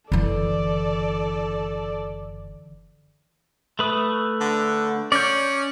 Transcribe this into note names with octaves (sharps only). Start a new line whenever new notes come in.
F#1 D3 E3 A4 D5
A3 B4 D#6
D3
C#4 D5 G6